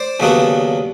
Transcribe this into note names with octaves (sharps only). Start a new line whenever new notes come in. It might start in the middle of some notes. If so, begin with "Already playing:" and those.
Already playing: C5 D5
D#2 C#3 F#3 B3 D4